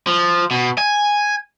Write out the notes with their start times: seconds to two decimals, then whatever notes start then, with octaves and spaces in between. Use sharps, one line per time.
0.07 F3
0.51 B2
0.78 G#5